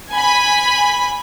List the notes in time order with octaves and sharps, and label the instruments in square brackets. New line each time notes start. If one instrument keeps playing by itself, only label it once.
[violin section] G#5 B5